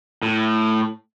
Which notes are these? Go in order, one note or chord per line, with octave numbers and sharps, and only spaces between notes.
A2